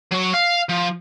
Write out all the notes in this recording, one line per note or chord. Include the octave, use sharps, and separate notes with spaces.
F#3 C#5
F5
F3